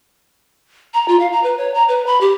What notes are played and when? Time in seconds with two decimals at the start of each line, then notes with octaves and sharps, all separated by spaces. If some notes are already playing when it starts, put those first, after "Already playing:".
0.94 A#5
1.08 F4
1.20 F5
1.32 A#5
1.44 B4
1.58 C#5
1.74 A#5
1.89 B4
2.07 B5
2.21 G4